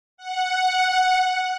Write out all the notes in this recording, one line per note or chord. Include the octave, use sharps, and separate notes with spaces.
F#5